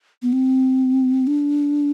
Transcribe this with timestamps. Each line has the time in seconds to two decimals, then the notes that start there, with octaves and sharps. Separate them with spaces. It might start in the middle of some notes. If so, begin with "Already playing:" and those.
0.22 B3
0.33 C4
1.27 D4